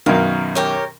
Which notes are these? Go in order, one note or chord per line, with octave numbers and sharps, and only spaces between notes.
F#2 B2 D#3 F5
G4 A#4 C#5